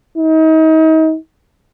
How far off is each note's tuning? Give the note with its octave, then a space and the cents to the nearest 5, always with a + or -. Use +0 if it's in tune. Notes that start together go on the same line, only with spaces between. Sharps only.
D#4 +35